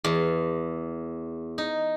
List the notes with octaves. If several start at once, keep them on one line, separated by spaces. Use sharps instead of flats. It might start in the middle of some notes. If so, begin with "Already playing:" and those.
E2
D#4